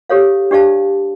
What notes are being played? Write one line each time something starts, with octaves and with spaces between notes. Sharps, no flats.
G4 A4 C#5 F5
D4 G4 D5 F5 A5